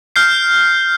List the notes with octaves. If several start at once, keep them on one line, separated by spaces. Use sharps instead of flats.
F6 G6 C7